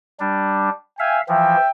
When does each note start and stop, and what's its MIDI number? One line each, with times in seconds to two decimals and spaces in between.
0.20 0.70 55
0.20 0.70 62
0.99 1.21 76
0.99 1.21 77
0.99 1.19 79
0.99 1.19 80
1.29 1.57 52
1.29 1.57 53
1.29 1.70 76
1.29 1.70 79